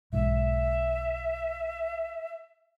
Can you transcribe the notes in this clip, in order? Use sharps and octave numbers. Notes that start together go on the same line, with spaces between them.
B1 G#2 E5